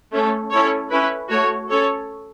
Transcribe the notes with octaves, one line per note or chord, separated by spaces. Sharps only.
A3 C#4 A4
C#4 E4 A4 C#5
C#4 E4 B4
A3 F#4 C#5
C#4 A4 C#5